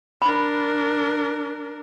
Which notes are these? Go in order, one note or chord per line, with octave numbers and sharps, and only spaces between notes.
D4 A#4 B5